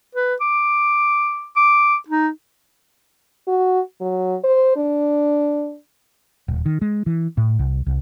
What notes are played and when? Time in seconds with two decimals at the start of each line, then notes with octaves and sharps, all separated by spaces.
0.15 B4
0.41 D6
1.56 D6
2.09 D#4
3.47 F#4
4.01 F#3
4.44 C5
4.76 D4
6.48 D#1
6.66 D#3
6.82 G#3
7.06 E3
7.37 A2
7.59 C2
7.87 C2